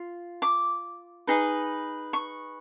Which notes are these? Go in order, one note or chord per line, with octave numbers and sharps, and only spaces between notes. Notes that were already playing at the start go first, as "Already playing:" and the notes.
Already playing: F4
D6
D#4 G#4 B4
C#6